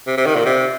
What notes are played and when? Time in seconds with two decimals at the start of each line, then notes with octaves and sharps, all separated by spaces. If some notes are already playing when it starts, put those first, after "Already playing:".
0.07 C3
0.18 C3
0.26 D#3
0.35 A#2
0.46 C3